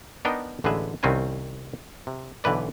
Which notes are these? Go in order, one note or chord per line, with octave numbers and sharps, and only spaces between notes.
B3 D4 D#4 A#4 G5
A1 D3 G#3 G#4 B4 E5
C2 D#3 C4 C#4 B4 G#5
C3
B1 D3 E3 B4 D5